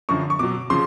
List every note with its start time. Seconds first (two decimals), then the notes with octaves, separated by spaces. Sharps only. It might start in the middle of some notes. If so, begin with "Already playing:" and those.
0.09 F#2 D3 F3 C#6
0.30 C#6
0.39 B2 F#3 D6
0.70 C#3 F3 C6